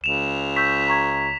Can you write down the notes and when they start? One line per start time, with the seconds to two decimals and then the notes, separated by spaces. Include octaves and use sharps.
0.04 C#2 E7 F7
0.56 C#6 E6 G6 B6
0.88 A#5 C#6 G#6